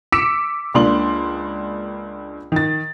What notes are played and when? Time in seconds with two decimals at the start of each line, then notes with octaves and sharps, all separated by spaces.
0.12 D6 E6 B6 C#7 D7 E7
0.74 C#2 A#3 D4 C6 F#7
2.52 D#3 A6